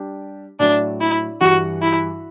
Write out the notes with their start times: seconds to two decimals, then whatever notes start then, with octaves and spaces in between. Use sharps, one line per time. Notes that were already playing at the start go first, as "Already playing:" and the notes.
Already playing: G3 D4 G4
0.60 A2 F#3 A3 D4
1.01 E4
1.41 G2 E3 G3 F#4
1.82 E4